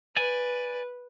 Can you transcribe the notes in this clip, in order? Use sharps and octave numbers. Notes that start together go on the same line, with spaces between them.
B4 D5 G#5